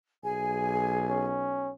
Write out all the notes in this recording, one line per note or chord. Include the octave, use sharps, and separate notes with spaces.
B1 G#4 G#5
C#4